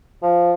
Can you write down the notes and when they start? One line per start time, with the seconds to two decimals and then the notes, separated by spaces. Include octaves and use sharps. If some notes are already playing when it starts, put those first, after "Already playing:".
0.23 F3